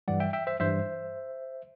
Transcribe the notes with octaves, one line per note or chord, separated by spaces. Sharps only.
G2 E3 G3 D5 F#5
E5 G5
E5 G5
C5 E5
G2 E3 G3 C5 E5